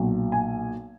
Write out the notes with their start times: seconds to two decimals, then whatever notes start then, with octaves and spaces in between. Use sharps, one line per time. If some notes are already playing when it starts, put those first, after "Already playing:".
Already playing: B1 A#2 F#3
0.32 G#5